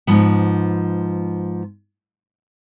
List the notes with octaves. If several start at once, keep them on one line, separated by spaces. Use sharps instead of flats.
G#2 F3 B3